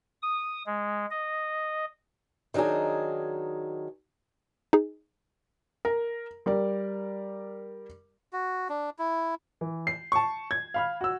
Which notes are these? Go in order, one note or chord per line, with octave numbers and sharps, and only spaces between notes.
D#6
G#3
D#5
D#3 F#3 D4 D#4 G#4
D#4 G#4
A#4
G3 A#4 D5
F#4
D4
E4
E3
C7
A5 C#6
G#6
F5 B5 F6
F#4 E6